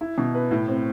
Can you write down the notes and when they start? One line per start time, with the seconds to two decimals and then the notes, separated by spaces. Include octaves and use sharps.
0.01 E4
0.18 B2
0.35 B4
0.51 A2
0.68 C4